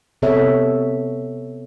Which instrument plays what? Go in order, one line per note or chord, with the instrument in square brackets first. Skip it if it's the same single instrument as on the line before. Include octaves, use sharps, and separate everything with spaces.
[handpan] C3 B3 A4 C#5 E5